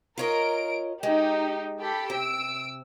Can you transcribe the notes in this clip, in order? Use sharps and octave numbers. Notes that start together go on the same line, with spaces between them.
F4 A#4 C#5 D#5 D7
G#3 D#4 G4
G4 A4 B5
C3 E6 D7